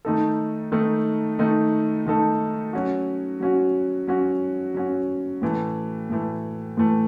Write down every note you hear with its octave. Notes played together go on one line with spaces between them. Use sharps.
D#3 A3 D#4 A4
D#3 A3 D#4 A4
D#3 A3 D#4 A4
D#3 A3 D#4 A4
F#3 C#4 F#4
F#3 C#4 F#4
F#3 C#4 F#4
F#3 C#4 F#4
A2 E3 A3
A2 E3 A3
A2 E3 A3